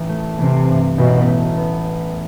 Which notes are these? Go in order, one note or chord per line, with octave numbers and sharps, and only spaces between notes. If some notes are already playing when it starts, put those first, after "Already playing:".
Already playing: A1 E3
A3
C3 E3
G2
A1 B2
A3
B3